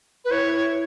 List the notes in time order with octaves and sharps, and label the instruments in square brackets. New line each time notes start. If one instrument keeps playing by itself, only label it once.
[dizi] B4
[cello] E4 [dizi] C#5